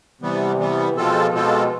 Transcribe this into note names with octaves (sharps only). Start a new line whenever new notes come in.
C3 E3 G3 B3
E3 G3 B3
B2 F3 G#3 C4 F4 A4
B2 F3 G#3 C4 F4 A4